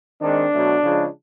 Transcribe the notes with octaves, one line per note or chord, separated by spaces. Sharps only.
D#3 G#3 C4 D4
B2 F#3 A3
C#3 F3 G#3